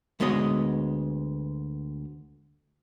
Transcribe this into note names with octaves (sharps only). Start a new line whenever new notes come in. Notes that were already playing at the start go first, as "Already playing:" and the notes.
D2 G#3 B3 C#5 D#5